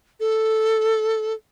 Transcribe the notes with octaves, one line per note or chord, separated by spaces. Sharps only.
A4